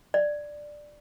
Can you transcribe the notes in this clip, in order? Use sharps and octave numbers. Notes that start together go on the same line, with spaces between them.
D5